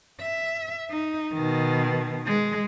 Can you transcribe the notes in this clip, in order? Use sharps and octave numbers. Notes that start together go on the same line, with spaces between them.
E5
D#4
B2 D#3
G#3